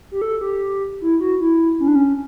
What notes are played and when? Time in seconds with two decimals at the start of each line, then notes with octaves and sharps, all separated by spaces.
0.11 G4
0.22 A4
0.41 G4
1.01 E4
1.21 F#4
1.40 E4
1.80 C#4
1.88 D4
1.95 C#4